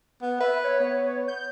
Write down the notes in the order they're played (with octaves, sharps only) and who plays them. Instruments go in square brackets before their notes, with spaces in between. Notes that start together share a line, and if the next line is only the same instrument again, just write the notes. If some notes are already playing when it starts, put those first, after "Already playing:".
[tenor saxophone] B3
[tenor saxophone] B4 [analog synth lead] E5
[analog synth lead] C#5
[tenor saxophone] B3
[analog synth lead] G6